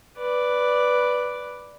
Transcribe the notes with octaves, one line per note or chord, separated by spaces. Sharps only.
B4 D5